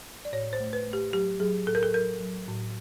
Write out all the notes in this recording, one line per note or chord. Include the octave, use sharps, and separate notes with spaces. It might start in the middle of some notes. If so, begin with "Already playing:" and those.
D5
A2 C#5
C5
A3
B4
A3
G4
F#3 G4
F#3 G#4
A2 A4
A#4
A4
F#3 A#4
F#3
A2